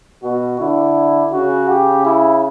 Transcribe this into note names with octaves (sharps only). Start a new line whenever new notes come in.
B2 F#4
D3 E4
C#3 F#4
G4
E4